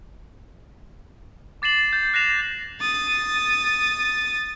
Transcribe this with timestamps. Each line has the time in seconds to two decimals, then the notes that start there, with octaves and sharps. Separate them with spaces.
1.62 D6 A6 C7 E7 F#7
1.93 G6 A6
2.14 F#6 A#6 C7 E7 F7
2.81 D#6 A6